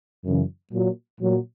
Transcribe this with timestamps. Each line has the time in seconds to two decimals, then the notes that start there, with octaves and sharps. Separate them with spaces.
0.25 F#2 C#3 E3
0.72 A#2 F#3
1.20 A#2 F#3